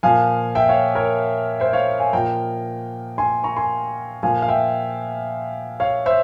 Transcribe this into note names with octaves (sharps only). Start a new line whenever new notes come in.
A#2 F3 F5 G#5
E5 G5
C#5 F5
A#4 C#5
C5 E5
C#5 F5
F5 G#5
A#2 F3 G5 A#5
G#5 C6
A#5 C#6
G#5 C6
A#2 F3 F5 G#5
F5
E5 G5
C#5 F5
C5 E5